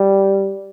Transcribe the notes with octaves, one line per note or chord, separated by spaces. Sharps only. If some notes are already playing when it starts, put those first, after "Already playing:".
Already playing: G3